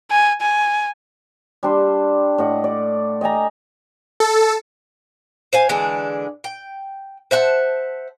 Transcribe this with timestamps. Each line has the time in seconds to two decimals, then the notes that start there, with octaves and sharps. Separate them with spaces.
0.11 G#5
0.41 G#5
1.63 G3 D4 C6
2.38 A2 D#5 F#5
2.64 D5
3.21 D#5 G5 G#5 A#5
4.20 A4
5.53 C5 F5 G#5
5.69 D3 E3 G#3 D4
6.44 G5
7.31 C5 E5 F#5 A5